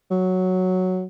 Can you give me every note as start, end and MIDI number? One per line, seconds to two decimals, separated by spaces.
0.11 1.06 54